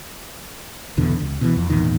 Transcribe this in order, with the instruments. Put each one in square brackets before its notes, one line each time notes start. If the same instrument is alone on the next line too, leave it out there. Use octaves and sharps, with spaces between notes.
[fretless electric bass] F#1 E2 B2 D3
C#2
B2 D3 E3
F2
G#1 E2 A#2 D#3